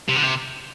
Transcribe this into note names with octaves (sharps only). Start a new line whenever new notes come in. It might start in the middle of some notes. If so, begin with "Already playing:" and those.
C3
D3
C3